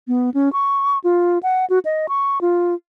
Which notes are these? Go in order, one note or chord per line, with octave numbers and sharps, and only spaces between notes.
B3
C#4
C#6
F4
F#5
F#4
D#5
C#6
F4